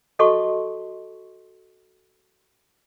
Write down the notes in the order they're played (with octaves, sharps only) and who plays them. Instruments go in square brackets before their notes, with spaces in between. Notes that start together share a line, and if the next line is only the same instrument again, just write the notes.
[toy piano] F#4 A4 D#5 A5 C6 C#6